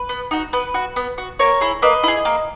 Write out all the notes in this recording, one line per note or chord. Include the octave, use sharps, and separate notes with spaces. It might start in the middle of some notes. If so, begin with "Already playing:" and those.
Already playing: B4
B3
D#4 F#4
B3 B4
F#4
B3
F#4
A#3 A#4 C#5
E4 G#4
A#3 B4 D#5
E4 G#4
A#3